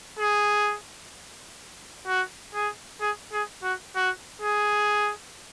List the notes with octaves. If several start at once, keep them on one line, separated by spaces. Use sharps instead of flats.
G#4
F#4
G#4
G#4
G#4
F#4
F#4
G#4